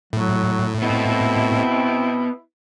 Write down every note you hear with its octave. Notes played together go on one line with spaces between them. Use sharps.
A2 F#3
B3 C4 E4 D#5